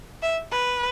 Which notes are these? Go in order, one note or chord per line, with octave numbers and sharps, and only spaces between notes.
E5
B4